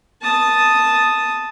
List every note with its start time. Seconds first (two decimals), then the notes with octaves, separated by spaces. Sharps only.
0.22 A5 D#6